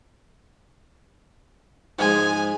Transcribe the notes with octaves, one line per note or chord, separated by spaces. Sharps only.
G#2 F3 G#3 G#5